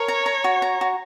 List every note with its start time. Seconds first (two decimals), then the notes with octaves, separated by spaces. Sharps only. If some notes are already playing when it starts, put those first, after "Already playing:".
Already playing: A#4 C#5
0.08 A#5
0.26 A#5
0.44 F#4
0.62 A#5
0.81 F#4